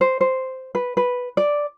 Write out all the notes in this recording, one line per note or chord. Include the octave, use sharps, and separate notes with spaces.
C5
C5
B4
B4
D5